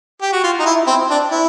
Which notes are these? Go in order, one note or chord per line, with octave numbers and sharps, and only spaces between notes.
G4
F#4
F4
D#4
E4
C4
D4
E4